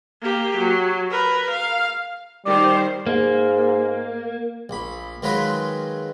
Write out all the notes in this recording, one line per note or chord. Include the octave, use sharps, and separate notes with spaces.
A#3 G4
F#3
A#4 B4
F5
D#3 G3 C5 D5
G#2 A#3
A#1 B5
D#3 F#3 G#3 F4 B4 B5